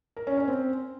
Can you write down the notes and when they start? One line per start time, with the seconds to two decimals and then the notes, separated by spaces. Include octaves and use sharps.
0.17 A#4
0.27 C#4
0.37 C#4
0.48 C4